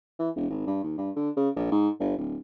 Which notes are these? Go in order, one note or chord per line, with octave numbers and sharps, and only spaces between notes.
E3
E1
G#1
G2
D#2
G2
D3
C#3
A#1
G#2
G1
D1